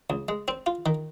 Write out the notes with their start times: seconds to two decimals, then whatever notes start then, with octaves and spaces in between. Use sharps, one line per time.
0.10 C#2
0.29 G#3
0.48 C4
0.66 F4
0.86 D#3